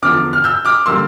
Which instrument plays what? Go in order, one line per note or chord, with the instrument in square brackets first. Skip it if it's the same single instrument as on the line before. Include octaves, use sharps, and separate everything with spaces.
[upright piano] E2 D3 F3 D6 F6
F6
E6 G6
D6 F6
D3 G3 A#3 C6 E6